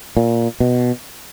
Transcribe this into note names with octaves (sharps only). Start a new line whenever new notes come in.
A#2
B2